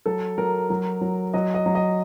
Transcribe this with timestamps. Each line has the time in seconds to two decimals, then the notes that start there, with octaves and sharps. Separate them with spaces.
0.06 F#3 A4
0.38 F#3 A#4
0.70 F#3
1.01 F#3
1.34 F#3 D#5
1.54 D#5
1.66 F#3
1.75 D#5